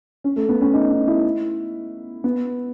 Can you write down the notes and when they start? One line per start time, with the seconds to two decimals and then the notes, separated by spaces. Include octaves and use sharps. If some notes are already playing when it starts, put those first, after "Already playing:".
0.24 C#4
0.36 A3
0.49 B3
0.61 C#4
0.74 D#4
0.91 D#4
1.07 E4
2.24 B3